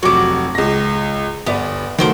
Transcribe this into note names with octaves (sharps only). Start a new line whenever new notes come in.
F1 F#3 F#4 D6
C#2 A#6
G1 B3 D5
D#3 F#3 A3 F4 C5 D6